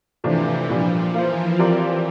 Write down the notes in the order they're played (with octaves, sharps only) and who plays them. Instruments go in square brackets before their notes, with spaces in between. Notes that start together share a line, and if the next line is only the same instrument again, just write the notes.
[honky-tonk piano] C3 F3 A3 D4 [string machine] E3
[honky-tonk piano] A#2 G3 D4 [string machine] F3
[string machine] E3 [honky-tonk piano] A#3 F4 C5
[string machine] E3 [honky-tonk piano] F3 C4 G4 A#4 D5